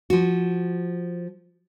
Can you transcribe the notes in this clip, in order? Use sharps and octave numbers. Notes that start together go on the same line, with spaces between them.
F3 F#4